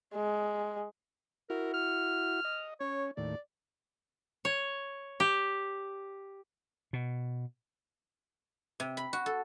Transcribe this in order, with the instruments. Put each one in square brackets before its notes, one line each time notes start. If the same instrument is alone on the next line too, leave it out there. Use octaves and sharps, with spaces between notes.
[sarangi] G#3
[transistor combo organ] E4 F#4 [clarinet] A#4
[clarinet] F6
[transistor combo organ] D#5
[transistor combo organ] C#4 [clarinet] C#5
[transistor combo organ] D#2 A2 [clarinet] D5
[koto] C#5
G4
[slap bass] B2
[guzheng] C3
B5
F#4
A4